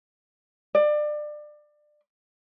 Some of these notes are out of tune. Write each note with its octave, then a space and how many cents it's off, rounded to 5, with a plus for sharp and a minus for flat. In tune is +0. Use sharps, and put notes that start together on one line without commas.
D5 +25